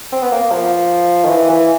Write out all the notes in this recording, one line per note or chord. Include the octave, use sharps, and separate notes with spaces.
C4
B3
A#3
F3
D#3
E3
E3